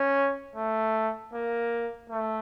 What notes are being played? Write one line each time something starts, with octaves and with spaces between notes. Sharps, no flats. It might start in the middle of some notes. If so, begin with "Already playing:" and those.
Already playing: C#4
A3
A#3
A3